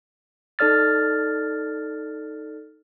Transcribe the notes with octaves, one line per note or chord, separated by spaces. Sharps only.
D#4 A4 D5 F6 A6